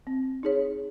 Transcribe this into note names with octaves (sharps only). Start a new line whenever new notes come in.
C4
D#4 G#4 C#5